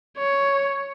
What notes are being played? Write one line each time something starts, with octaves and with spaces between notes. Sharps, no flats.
C#5